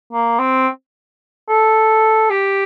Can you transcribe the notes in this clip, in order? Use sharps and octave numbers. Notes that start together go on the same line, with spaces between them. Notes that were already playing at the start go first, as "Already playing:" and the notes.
A#3
C4
A4
G4